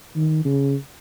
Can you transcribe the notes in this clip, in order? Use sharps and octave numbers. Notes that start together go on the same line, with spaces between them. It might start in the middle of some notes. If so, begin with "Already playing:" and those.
D#3
C#3